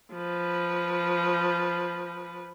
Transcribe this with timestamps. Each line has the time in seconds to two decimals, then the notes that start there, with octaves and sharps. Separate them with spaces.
0.14 F3 B4